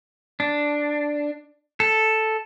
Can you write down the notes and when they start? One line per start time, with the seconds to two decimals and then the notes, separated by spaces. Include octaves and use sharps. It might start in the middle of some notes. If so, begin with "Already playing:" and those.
0.40 D4
1.80 A4